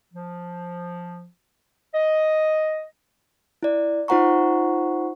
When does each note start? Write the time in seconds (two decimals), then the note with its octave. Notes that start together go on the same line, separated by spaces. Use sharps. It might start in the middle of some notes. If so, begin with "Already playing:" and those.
0.14 F3
1.95 D#5
3.63 E4 D5
4.08 D#4 F4 C5 F#5 A#5 C#6